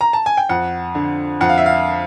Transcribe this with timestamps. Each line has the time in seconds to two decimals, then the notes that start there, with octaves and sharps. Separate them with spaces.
0.01 A#5
0.13 A5
0.26 G#5
0.37 G5
0.49 F2 F#5
0.95 D3
1.41 F2 F#5
1.49 F5
1.58 E5
1.66 F5